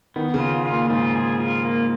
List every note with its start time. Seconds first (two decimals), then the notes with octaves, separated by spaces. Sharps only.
0.16 D#3 B3
0.34 C#3
0.40 F4
0.66 F4
0.71 A#2
0.90 G#2 F4
1.15 G#4
1.40 F4
1.65 A#3